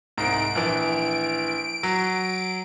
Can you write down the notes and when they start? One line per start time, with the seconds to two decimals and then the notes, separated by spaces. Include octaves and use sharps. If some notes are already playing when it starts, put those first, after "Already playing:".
0.18 C2 G#2 D7
0.55 A#1 E3
1.83 F#3